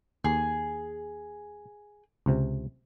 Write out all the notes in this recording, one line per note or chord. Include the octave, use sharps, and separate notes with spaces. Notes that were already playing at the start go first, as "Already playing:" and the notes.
D#2 G#4
C#2 C3